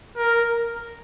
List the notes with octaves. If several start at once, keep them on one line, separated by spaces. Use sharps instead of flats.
A#4